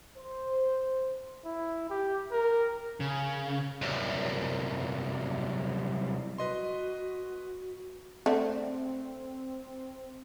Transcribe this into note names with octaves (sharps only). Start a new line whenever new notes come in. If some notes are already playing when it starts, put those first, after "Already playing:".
C5
E4
G4
A#4
C#3
C2 F#2
F#4 B4 D#5 C6
D3 A3 C4